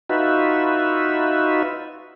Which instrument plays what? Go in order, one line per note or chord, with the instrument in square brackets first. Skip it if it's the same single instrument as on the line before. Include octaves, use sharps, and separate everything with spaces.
[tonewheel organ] D#4 F4 F#4 B4 E5